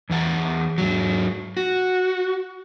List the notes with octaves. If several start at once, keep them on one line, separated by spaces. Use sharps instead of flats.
E2 E3 F#5 A5
G#2 F#3
F#4